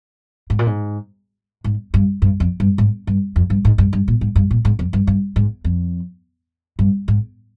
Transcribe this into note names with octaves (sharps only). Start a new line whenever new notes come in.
G#2
A#2
G#2
G#2
G2
G2
F2
G2
G#2
G2
F2
G2
G#2
G2
G2
A#2
G#2
G2
A#2
G#2
F2
G2
G2
G#2
F2
G2
G#2